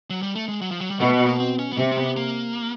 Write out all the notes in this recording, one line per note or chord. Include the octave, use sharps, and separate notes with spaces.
F#3
G3
A3
G#3
F#3
F3
F#3
G3
B2 A3
B3
A#3
C4
C#4
B3
C3 C4
C4
B3
A#3